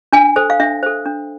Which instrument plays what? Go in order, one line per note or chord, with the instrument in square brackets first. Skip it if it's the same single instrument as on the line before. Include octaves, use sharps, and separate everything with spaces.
[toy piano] D4 G#5
A4 C5
F5
D4 E5
A4 C5
D4